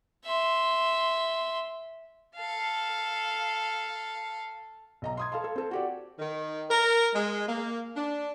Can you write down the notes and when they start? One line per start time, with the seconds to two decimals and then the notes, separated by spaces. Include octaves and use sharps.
0.25 E5 C6
2.36 A4 F5
5.02 B1 D#5 A#5
5.17 C6 D#6 G#6
5.32 A4 F5 A5 C6
5.44 A4
5.56 C4 A4
5.71 F#4 G4 D5
6.19 D#3
6.70 A#4
7.14 G#3
7.47 A#3
7.96 D4